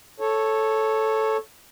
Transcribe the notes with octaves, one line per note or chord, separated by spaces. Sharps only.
A4 C#5